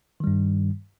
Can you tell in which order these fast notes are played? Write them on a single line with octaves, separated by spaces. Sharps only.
D#3 G3 G2